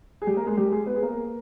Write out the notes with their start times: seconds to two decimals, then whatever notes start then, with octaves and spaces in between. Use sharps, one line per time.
0.22 G#4
0.27 G3 G4
0.36 A#3 A#4
0.46 G#3 G#4
0.57 G3 G4
0.72 G#3 G#4
0.86 B3 B4
0.96 G#4
1.02 A#3 A#4